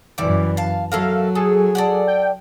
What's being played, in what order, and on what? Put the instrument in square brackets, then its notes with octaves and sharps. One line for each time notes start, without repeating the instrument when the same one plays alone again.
[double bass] F#2 E3 [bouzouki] G3 E4 D5
[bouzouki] F5 A5
[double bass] F#3 [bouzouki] E4 A4 A#4 [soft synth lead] F5
[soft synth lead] G#4 [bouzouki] A4
[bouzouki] A4 D5 F#5
[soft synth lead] G5